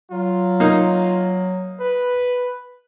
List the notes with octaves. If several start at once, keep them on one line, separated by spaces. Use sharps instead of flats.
F#3 F4
A#3 D#4
B4